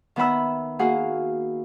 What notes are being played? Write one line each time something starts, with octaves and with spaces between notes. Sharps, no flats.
D#3 B3 E5 F#5 B5 E6
A#3 F#4 G#4 F5 F#5